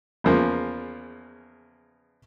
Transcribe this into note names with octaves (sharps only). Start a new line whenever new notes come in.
E2 C#3 F3 A#3